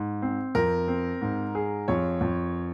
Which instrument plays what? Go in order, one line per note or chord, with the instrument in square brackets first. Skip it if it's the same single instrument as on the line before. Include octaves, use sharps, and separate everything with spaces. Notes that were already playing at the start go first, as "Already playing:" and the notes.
Already playing: [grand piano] G#2
C4
[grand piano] F2 [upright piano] A#4
[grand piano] C4
G#2
G#4
[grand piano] F2 [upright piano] C#5
[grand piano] F2